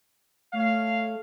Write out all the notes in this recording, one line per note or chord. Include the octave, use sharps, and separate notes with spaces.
A3 C#5 F5